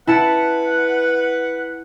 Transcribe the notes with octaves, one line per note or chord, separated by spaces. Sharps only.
E4 B4 F#5 A5 C#7